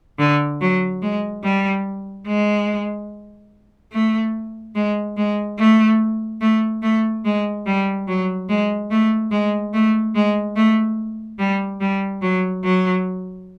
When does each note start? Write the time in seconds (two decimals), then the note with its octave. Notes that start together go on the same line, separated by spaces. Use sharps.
0.19 D3
0.61 F#3
1.02 G#3
1.43 G3
2.27 G#3
3.92 A3
4.75 G#3
5.17 G#3
5.59 A3
6.41 A3
6.82 A3
7.25 G#3
7.66 G3
8.08 F#3
8.49 G#3
8.90 A3
9.31 G#3
9.73 A3
10.15 G#3
10.56 A3
11.39 G3
11.81 G3
12.22 F#3
12.64 F#3